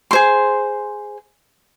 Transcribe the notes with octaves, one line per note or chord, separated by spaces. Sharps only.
G#4 C5 C6